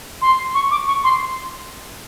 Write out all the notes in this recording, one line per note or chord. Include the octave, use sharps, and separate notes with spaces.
C6
C#6
D6
C#6
C6